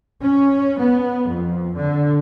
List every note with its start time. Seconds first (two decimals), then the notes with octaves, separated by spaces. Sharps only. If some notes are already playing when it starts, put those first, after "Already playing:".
0.23 C#4
0.79 B3
1.30 F2
1.77 D3